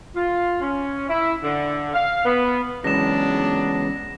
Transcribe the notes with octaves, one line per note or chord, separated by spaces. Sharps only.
F4
C#4
E4
D3
F5
B3
C#3 E3 F#3 G#3 B3 D4 A#6 E7